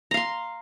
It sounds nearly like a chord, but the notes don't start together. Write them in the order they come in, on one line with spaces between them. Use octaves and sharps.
A#5 F5 C6